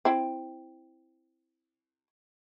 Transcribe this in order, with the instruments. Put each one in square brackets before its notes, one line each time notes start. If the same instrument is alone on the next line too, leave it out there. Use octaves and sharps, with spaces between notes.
[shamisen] C4 E4